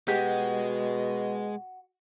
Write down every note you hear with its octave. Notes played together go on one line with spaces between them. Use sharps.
B2 G#3 F#4 G4